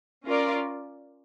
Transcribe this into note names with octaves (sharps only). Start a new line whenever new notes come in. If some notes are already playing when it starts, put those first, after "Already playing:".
C#4 F4 A#4 D5